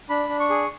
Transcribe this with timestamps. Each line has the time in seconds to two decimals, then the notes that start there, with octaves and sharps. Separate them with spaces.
0.09 D4 B5
0.29 D4
0.40 C#6
0.50 G#4